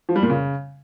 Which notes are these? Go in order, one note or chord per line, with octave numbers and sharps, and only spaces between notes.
F3
G3
A#2
C#3